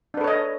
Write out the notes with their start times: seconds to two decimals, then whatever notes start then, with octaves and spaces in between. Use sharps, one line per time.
0.14 D4
0.17 B4
0.21 A4
0.24 C#5
0.28 D#5